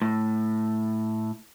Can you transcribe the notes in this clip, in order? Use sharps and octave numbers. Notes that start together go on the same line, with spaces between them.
A2